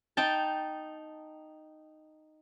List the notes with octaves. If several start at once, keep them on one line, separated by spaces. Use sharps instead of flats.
D#4 G5 A5